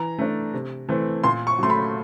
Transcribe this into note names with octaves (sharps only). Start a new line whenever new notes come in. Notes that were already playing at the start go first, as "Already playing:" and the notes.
Already playing: E3 A#5
A3 D4
C3
E3 A3 C4
A#2 C6
C#6
F#3 A3 C6
B5